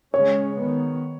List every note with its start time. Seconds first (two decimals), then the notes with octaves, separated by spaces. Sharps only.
0.14 C#3 G#3 C#4 C#5
0.55 D#3 B3